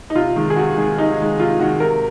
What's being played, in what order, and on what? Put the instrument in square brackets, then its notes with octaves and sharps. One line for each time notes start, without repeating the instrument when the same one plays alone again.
[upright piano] D#4
C3 F4
D#3 G#3
G#4
C3 F#4
D#3 G#3
C3 D#4
D#3 G#3
C3 F4
D#3 G#3 F#4
C3 A#4